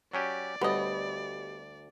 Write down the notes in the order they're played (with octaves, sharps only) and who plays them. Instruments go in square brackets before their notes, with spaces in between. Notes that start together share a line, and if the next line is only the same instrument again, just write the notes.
[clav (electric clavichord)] F#3 C#4 G4 [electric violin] D5
[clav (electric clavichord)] D2 [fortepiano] G3 C#5 [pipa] B3 D#5